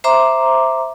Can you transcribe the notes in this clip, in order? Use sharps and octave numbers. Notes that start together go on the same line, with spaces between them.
C5 E5 A#5 C6 D6